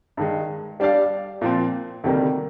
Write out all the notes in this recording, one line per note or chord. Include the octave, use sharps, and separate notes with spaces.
G2 D#3 G#3
G3 D4 G4 D5 F5
A#2 F3 C4
D2 C3 D#3 G3 A#3